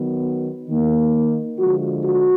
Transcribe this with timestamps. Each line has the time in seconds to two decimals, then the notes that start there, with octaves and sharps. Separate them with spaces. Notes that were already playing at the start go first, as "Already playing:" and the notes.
Already playing: D#3 F#3 B3
0.69 D#3 A#3
1.59 D3 F3 G#3 F#4
2.04 F#4